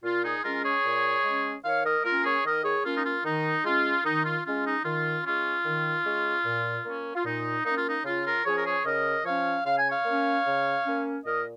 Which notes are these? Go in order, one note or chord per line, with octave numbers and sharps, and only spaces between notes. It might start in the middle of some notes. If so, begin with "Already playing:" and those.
A#2 F4
D#4 G#4
G#3 C#4 F4 A#4
G#4 C#5
A#2
G#3 C#4
D#3 C#5 F5
A#4 D#5
A#3 C#4 F4 A#4
G#4 C#5
D#3 A#4 D#5
G#4 C#5
A#3 C#4 F4
D#4
F4
D#3 D#4
G#3 C#4 F4
D#3 D#4
F4
G#3 C#4 F4
D#4
D#3 F4
G#3 C#4 F4
D#3
G#3 C#4
A#2
A#3 C#4
F4
A#2 D#4
A#3 C#4 D#4
F4
D#4
C#3 F4
F4 A#4
F3 C#4 G#4 C#5
A#4
G#4 C#5
C#3 A#4 D#5
F3 C#4 C#5 F5
C#3 F5
G#5
C#5 F5
A#3 C#4
C#3
A#3 C#4
A#2 A#4 D#5